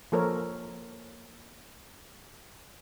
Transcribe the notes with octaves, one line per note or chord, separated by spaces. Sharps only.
F3 A#3 A4 A#4 C5 C#5